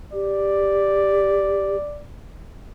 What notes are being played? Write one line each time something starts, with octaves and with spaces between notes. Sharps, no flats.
G4 D5